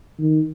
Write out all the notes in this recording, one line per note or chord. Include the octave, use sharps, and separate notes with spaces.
D#3